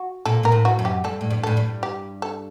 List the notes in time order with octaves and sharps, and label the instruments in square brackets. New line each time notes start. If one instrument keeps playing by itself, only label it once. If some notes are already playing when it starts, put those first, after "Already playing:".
Already playing: [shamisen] F#4
[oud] A#2 [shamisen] A4
[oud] A#2 [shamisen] A#4
[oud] A2
[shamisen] F#4
[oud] F#2
[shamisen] G4
[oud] G2 [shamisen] A4
[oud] A2
G2
[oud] A2 [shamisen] A4
[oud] G2
[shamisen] G4
A4